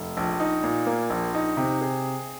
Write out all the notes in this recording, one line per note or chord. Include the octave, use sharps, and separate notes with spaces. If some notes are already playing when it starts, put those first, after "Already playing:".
Already playing: F1
A#1
D#4
A#2
A#3
A#1
D#4
C3
G#4